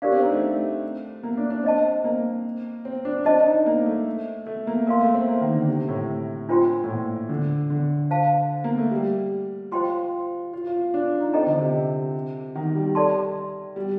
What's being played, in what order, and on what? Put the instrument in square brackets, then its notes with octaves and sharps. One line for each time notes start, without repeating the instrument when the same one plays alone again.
[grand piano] D4 [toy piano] G4 A#4 D5 F5
[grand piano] C4
D#4
A3
A#3
D4
D4
[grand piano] C4 [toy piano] C5 D#5 A5
[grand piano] A#3
C4
D4
[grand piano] D4 [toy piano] C5 D#5 A5
[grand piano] D#4
A#3
A3
A3
A#3
[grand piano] A#3 [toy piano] A#4 F5 C6
[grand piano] A3
C4
A#3
D#3
D3
C3
A2
[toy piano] D4 F4 C5 G5 C6
[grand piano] A2
A#2
D3
D3
[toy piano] C5 F5 A5
[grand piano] A#3
A3
G3
[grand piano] F4 [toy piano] C5 G5 C6
[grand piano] F4
F4
D4
D#4
[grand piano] C4 [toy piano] A4 D#5 G5 A#5
[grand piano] D3
C3
D#3
G3
[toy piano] A4 D5 A5 C6
[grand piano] G3